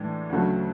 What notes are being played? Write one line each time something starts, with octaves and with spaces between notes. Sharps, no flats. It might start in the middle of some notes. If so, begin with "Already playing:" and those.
Already playing: A2 E3 G#3 D4
D2 C#3 F#3 A3